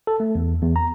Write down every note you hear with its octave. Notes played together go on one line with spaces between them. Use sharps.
A4
A3
E2
E2
A#5